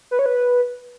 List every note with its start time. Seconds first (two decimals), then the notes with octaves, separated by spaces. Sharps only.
0.11 B4
0.19 C#5
0.26 B4